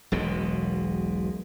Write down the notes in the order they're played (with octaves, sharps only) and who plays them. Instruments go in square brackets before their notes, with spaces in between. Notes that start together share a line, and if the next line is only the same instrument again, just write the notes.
[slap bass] E1 B1 B2 G#3